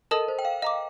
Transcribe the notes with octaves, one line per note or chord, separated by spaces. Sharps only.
A4 A#4 D#5 A5 D#6
C5
G5
F5
D#5 F5 A#5 D6